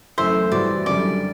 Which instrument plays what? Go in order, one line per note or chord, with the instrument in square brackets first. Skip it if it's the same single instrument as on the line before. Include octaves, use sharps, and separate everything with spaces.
[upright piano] F#2 E3 A3 [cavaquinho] C5 E5
[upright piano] A2 E3 G3 C4 F#4 [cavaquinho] D5
[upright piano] F#2 D3 G3 [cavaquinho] D5